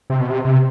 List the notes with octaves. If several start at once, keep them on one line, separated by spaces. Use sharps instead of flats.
C3
B2
C3
C3